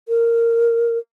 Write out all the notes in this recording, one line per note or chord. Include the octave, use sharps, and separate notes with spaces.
A#4